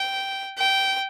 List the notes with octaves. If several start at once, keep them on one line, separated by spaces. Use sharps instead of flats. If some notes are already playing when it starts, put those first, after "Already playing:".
Already playing: G5
G5